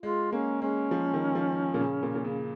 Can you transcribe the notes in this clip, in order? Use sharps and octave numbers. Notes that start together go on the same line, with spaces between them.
G#3 F4
A#3 C#4
G#3 C#4
F3
D#3
F3
A#2
C#3
A#2
A#2
C#3